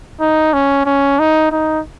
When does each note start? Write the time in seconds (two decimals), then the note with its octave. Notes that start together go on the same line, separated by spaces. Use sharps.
0.21 D#4
0.53 C#4
0.86 C#4
1.19 D#4
1.52 D#4